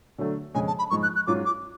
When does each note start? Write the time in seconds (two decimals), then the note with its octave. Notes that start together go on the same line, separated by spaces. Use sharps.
0.18 D3 F#3 A3
0.55 F2 C#3 G#3 G#5
0.67 A5
0.79 B5
0.90 G#2 F3 G#3 C#6
1.03 F#6
1.16 F#6
1.27 G#2 F#3 C#4 F4 D6
1.46 D6